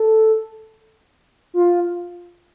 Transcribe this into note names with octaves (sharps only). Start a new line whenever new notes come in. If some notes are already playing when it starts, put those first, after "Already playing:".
Already playing: A4
F4